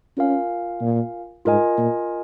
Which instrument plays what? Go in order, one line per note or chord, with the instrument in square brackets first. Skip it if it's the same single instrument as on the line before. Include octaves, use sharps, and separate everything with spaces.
[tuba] C#4 [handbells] F4 A#4 F5 G#5
[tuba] A#2
[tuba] G#2 [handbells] F4 A#4 D#5 G#5
[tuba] A#2